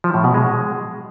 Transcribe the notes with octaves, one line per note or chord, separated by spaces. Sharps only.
F3
A2
B2
G#3